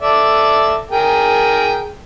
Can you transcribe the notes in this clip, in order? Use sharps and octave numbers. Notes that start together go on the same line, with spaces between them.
A4 D5 E5
G#4 A#4 G5